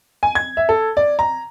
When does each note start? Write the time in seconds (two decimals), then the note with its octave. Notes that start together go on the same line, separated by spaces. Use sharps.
0.23 G#5
0.35 G#6
0.57 E5
0.69 A4
0.97 D5
1.19 A#5